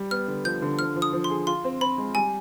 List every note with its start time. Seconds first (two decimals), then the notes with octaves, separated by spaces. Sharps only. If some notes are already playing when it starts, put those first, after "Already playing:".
Already playing: G3
0.11 B3 F6
0.28 D3
0.45 F3 G6
0.62 D3
0.79 F3 F6
0.96 F3
1.02 D#6
1.13 F3
1.24 C6
1.30 G#4
1.47 F4 C6
1.64 C4
1.81 C4 B5
1.98 G#3
2.15 G3 G#5